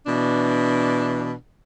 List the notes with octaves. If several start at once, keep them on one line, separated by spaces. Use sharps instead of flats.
B2 E3 D4